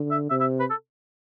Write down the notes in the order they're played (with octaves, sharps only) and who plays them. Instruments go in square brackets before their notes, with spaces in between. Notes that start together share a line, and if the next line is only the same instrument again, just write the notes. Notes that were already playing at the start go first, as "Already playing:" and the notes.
Already playing: [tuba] D3
[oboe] E5
[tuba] C3 [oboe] E5
[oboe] E5
B4
A4